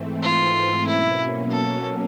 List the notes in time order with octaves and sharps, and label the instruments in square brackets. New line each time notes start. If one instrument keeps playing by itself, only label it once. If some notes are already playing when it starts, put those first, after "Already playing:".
Already playing: [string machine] G#2 E3 A3 C4
[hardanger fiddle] F4
[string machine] B2 F#3 A#3 C#4 [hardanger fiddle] E4
[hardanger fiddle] A4